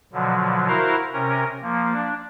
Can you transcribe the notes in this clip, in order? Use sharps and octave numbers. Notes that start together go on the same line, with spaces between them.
B2 D3 F3 F#3
E4 F#4 A#4 C5 F5
C3 C#4 A#4
F3 A#3
D4